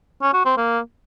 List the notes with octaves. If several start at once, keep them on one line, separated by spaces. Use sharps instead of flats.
C#4
F#4
C4
A#3